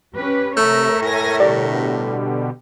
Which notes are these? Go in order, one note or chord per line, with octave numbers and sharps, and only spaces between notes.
C#4 G4 B4
C3 A3 A#4 C#5 E5
A2 G#5 A#6
B2 D3 G3 G4 D5